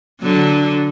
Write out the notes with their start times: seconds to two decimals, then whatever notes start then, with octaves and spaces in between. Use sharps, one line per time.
0.21 D3 F#3